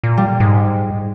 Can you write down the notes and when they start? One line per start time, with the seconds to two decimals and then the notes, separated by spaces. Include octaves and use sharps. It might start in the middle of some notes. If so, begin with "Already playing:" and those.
0.03 A#2
0.18 G3
0.40 G#2